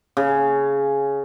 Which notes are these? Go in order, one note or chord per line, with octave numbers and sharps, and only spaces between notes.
C#3